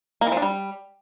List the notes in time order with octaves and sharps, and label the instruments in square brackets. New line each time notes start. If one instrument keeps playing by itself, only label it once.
[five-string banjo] A#3
E3
F3
D4
G3